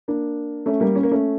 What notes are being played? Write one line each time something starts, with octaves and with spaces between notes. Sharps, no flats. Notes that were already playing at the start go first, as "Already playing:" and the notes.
A#3 D4
A3 C#4
G3 A#3
C#4
A#3
A3 C#4